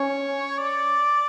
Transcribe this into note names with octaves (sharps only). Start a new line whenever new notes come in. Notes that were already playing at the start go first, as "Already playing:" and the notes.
Already playing: C#4 C#5
D5